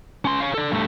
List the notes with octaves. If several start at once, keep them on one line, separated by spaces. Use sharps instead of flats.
C#4 C6
C#5 F5
A4 D5
G2 A3